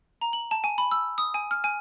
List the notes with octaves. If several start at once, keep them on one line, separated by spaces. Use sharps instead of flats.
A#5
F#7
A5
G#5
B5
E6
D#6
G#5
F6
G#5